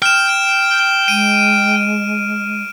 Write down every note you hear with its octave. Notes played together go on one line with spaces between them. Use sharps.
G5 F6 E7
G#3 D7 D#7